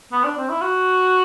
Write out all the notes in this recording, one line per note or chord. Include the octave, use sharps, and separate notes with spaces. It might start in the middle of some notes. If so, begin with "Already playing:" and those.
B3
D4
C4
E4
F#4